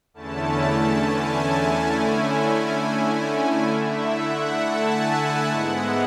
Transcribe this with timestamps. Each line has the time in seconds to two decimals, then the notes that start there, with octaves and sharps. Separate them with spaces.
0.14 E2 D3 A3 C#4 E4 A5
1.03 G#5
1.48 G#5
1.93 D3 A3 C#4 E4
3.70 D3 A3 E4 E5
4.15 F#5
4.60 A5
4.89 G#5
5.20 A5
5.49 G#2 G#3 B3 E4 F#5